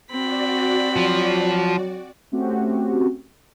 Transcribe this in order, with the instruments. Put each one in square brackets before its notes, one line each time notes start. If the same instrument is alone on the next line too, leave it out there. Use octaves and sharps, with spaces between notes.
[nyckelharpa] C4 B5 [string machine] F#4 D5
[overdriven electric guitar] F3 [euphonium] F#3
[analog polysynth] A3 C4 C#4 F#4 G4